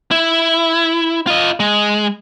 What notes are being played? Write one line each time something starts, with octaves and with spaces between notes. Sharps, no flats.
E4
F4 D#5
G#3